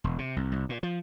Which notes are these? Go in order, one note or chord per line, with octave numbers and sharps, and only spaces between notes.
E1
C3
C2
C2
A#2
F3